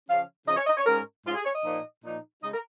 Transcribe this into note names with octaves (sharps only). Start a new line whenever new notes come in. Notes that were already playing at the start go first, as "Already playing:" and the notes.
C#3 F3 C#4 F5
C#3 F3 C#4 D#5
C#5
D#5
C#5
G#2 G#3 C#4 A#4
G#2 G#3 C#4 F4
G#4
C#5
D#5
A#2 F3 A#3 D#4
A#2 F3 A#3 D#4
C#3 G#3 D#4 D#5
A#4